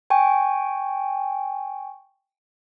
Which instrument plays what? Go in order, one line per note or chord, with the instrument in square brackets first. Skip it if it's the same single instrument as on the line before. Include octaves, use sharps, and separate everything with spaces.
[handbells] G5 G#5 C#6